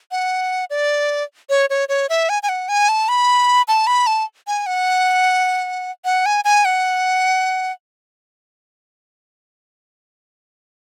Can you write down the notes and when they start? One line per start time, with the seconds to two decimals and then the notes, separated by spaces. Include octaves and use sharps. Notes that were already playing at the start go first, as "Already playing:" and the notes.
0.11 F#5
0.70 D5
1.49 C#5
1.70 C#5
1.89 C#5
2.09 E5
2.29 G#5
2.43 G#5
2.49 F#5
2.69 G#5
2.89 A5
3.09 B5
3.68 A5
3.87 B5
4.07 A5
4.47 G#5
4.66 F#5
6.05 F#5
6.26 G#5
6.45 G#5
6.65 F#5